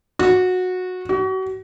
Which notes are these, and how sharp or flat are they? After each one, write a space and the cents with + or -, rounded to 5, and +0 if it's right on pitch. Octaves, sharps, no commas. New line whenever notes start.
F#4 -15
F#4 +35